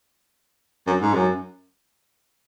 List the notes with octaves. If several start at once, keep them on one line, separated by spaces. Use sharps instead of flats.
F#2
G#2
F#2